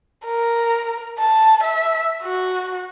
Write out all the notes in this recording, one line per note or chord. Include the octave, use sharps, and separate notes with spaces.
A#4
A5
E5
F#4